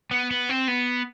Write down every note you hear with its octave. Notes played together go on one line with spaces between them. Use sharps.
B3
B3
C4
B3